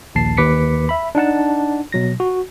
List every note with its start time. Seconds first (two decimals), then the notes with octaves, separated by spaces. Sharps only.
0.15 A#1 D#2 A5 C7
0.37 D#2 B4 D6 B6 C#7
0.89 E5 B5
1.15 D4 D#4 F#5 A5
1.92 B2 F#3 A#6
2.20 F#4